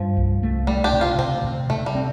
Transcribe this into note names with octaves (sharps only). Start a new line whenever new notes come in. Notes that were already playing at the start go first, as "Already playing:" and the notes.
Already playing: G2 F3
C2
A3
G3 A3
D4 G4
C3
C4 F4
C3 C4
C3
C3 A3
G3
C4